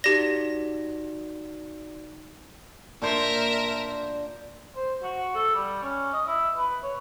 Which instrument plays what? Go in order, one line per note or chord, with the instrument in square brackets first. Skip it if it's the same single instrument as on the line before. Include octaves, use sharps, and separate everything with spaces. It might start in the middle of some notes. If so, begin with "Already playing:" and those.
[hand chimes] D#4 F#4 D5 [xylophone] G4 A#6
[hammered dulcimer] A#2 D4 C5 [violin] A#4 E5
[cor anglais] C5
F#4
A4
G3
C#4
D#5
E4
B4
C#5